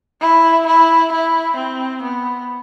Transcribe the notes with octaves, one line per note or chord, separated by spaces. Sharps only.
E4
E4
E4
C4
B3